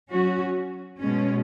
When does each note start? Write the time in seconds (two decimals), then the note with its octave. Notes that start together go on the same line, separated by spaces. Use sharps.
0.10 F#3 C#4 F#4
0.99 B2 G#3 C#4